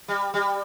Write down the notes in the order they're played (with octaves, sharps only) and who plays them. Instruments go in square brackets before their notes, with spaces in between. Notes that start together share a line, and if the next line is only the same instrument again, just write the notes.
[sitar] G3
G3